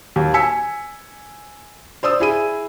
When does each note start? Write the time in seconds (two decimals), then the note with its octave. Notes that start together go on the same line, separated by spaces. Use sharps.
0.16 D#2
0.34 G#5 E6 B6 C#7
2.03 C5 D5 D#6 E6
2.20 E4 G#4 D#7